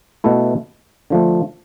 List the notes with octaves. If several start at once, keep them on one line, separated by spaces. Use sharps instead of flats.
B2 A3 E4
D3 F3 A3